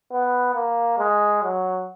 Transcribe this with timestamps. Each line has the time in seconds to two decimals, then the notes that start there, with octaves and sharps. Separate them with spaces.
0.11 B3
0.55 A#3
0.99 G#3
1.43 F#3